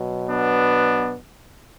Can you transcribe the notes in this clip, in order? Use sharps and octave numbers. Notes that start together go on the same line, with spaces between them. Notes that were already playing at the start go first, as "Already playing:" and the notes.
Already playing: B2 F#3
B3 D4